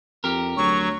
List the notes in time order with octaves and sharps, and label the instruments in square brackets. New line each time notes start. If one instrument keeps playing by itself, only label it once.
[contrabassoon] F2 [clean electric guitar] G4 A#4
[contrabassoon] D2 [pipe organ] F#3 [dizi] C#6